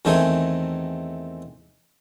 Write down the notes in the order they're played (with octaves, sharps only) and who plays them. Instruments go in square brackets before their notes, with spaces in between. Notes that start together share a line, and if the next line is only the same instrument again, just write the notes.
[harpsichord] E2 D#3 A3 C4 D#4 G#5